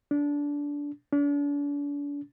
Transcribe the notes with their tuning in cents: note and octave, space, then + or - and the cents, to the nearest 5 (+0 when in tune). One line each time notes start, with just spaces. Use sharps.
D4 -20
D4 -40